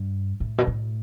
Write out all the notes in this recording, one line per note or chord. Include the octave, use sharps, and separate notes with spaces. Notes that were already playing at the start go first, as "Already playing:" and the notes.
Already playing: G2
A2
B2
A2